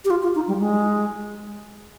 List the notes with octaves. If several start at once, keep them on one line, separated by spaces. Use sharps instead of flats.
G4
F4
F4
D#4
G3
G#3